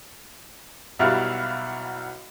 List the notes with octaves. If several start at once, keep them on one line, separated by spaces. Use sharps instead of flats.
B1 G3 E4 F#4 F5